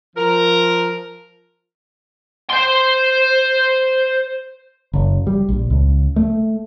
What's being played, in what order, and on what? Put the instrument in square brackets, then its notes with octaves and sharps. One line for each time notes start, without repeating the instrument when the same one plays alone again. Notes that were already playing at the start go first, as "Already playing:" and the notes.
[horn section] F3 A#4
[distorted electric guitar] C5 C6
[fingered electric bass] F#1
G3
A#1
C#2
A3